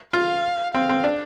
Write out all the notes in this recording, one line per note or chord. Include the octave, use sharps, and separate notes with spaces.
F4 F5
C4 F5
C4
D4